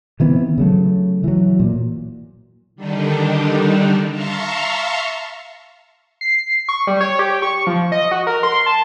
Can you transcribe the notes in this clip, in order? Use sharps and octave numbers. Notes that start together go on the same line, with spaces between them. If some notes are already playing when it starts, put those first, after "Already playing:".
D#3 E3 B3 C4
C#3 F#3 A3
E3 F#3
A#2
D3 D#3 G3 D4 D#4
E5 F5 A5 A#5 C6 C#6
C7
C#6
G3
C#5
G4
C#6
F3
D#5
F#4
A#4
C6
A5